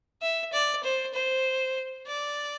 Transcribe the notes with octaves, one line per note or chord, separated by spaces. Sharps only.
E5
D5
C5
C5
D5